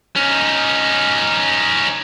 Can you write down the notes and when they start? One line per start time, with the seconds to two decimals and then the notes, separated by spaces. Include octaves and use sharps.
0.16 C#4 D#4